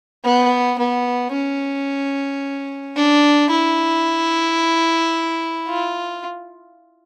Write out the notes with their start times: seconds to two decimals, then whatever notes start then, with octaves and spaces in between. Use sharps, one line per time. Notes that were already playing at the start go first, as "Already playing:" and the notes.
0.24 B3
0.79 B3
1.33 C#4
2.96 D4
3.50 E4
5.68 F4